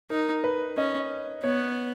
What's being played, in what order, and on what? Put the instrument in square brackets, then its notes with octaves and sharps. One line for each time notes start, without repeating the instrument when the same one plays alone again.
[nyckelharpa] D#4 [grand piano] A#4
[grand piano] B4
[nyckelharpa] C#4 [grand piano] D#5
[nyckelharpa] B3 [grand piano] C#5